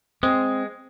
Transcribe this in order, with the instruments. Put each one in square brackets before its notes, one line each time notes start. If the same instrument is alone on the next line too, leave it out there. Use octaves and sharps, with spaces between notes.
[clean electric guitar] G#3 [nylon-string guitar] C4